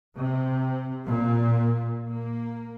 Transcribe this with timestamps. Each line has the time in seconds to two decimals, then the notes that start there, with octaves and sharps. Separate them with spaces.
0.16 C3
1.07 A#2
2.10 A#3